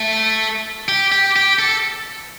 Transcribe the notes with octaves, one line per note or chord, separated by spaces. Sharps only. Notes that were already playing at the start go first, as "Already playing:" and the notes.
Already playing: A3
G4
G4
G4
A4